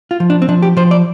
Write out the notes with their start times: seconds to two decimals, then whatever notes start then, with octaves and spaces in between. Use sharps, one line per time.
0.11 F4
0.20 F3
0.30 D4
0.42 C4
0.49 F3 D4
0.62 G4
0.77 F3 C5
0.91 D5